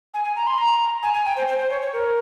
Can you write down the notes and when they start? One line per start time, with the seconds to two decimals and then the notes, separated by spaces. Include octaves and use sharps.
0.14 G#5
0.24 G#5
0.36 A#5
0.47 C6
0.58 A#5
1.03 G#5
1.14 G#5
1.25 G5
1.37 C5
1.48 C5
1.59 C5
1.70 C#5
1.81 C#5
1.93 A#4